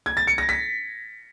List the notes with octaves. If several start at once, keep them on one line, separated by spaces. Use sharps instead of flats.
G#6
A6
C#7
A#6
B6